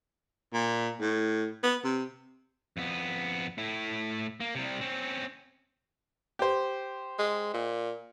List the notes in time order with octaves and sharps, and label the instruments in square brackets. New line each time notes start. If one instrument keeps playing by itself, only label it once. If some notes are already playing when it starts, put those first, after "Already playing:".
[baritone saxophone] A#2
A2
B3
C3
[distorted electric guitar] F2 B3
A2 E4
A#3
C3 G3
C4 C#4
[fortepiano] G4 C5
[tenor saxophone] G#3
A#2